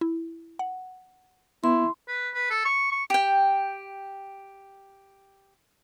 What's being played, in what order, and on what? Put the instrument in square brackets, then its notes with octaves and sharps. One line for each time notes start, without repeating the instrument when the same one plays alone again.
[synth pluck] E4
F#5
[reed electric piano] B3 [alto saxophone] E4 [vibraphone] C6
[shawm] B4
B4
A4
C#6
C#6
[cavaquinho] G4 G5